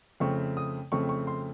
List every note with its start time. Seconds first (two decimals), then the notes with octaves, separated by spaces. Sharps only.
0.20 F2 C#3 A3 C4 C#6
0.57 D#6
0.92 F2 C#3 A3 C4 C#6
1.09 C#6
1.27 C6